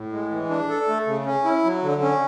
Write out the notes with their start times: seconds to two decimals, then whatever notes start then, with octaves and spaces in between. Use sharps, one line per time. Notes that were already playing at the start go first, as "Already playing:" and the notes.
Already playing: A2
0.12 G#3
0.31 E3
0.50 D4
0.69 A4
0.88 A3
1.07 C#3
1.26 C#4
1.45 E4
1.64 F#3
1.83 D3
2.02 C#4